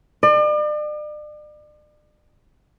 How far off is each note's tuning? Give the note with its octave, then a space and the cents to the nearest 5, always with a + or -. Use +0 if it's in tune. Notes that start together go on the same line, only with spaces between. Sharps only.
D5 +40